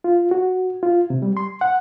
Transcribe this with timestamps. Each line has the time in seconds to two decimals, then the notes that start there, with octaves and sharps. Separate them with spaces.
0.04 F4
0.31 F#4
0.83 F4
1.10 C3
1.22 G3
1.37 C6
1.61 F#5